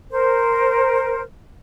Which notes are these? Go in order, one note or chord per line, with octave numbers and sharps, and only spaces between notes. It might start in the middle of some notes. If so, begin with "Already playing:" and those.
A#4 C5